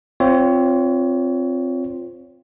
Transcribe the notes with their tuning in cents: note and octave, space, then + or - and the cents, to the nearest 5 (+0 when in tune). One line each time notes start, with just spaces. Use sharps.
C4 +0 F4 +0 C#5 +25